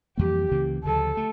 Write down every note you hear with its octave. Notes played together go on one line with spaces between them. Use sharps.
F2 E3 G3 A#3 G4
C#2 C#3 E3 A#3
D2 C#3 F3 A4
A3